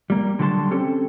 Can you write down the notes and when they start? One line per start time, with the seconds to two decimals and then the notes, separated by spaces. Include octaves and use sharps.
0.10 G3 A#3
0.39 D3 F#3 G3 F#4 A5 C6
0.71 C4 C#4 G4 A4